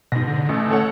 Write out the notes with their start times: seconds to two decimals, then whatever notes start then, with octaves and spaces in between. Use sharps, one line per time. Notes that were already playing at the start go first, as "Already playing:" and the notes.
0.12 G#2 B2 A#6
0.28 D3
0.49 A1 A3
0.71 A4 C#5 F#5